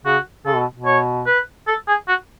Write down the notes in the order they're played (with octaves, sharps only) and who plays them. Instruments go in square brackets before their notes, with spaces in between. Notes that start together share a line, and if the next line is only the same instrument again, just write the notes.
[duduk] C#3 [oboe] F#4
[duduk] C#3 [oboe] A4
[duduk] B2
B2
[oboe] C#5
B4
A4
G#4
F#4